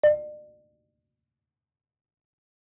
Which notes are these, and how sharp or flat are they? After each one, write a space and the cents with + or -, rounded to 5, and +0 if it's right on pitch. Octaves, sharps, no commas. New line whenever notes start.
D5 +40